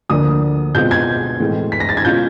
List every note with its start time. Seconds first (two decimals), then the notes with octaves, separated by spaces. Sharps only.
0.09 D2 D3 F3 A#3 D4 D#6
0.75 B2 G#3 C4 F4 G6
0.91 G#6
1.40 A2 E3 G#3 C4
1.72 B6
1.80 A#6
1.89 A6
1.97 G#6
2.05 B2 G#3 C#4 F4 G6